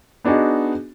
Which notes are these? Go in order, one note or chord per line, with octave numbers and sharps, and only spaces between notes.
B3 D4 D#4 F#4 G#4